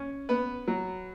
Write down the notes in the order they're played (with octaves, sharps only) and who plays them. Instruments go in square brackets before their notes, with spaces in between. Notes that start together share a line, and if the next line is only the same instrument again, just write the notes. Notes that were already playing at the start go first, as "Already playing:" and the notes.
Already playing: [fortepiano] C#4
B3 B4
F#3